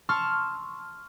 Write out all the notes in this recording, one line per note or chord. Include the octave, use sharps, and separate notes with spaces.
A5 C6 C#6 E6 F6